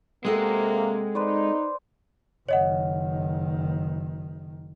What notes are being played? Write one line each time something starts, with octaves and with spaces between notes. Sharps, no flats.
C3 G#3 A#3 C4 A4 F#5
D#4 B4 C5 D5
F#1 D#3 C#5 D#5 F#5